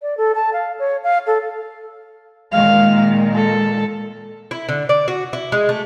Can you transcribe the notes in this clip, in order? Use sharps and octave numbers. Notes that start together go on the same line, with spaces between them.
D5
A4
A5
F5
C#5
F5
A4
A#2 D#3 G#3 F5
A4
E4
D3
D5
F#4
E4
G#3
A3